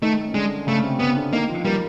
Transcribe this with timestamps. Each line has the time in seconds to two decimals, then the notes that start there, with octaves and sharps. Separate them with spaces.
0.02 D#3 A3 D#4
0.28 C#4
0.34 D3 G#3 D4
0.67 C#3 A3 C#4
0.84 C3 C4
0.99 C#3 B3 C#4
1.16 D3 D4
1.33 D#3 A#3 D#4
1.49 F3 F4
1.64 G3 A#3 A#4